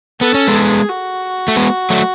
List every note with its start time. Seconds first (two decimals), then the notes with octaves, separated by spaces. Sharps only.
0.21 B3 A4
0.34 C#4
0.47 G#3 B3
0.55 G#4
0.89 F#4
1.48 A3
1.56 G#3 B3
1.90 F#3 A3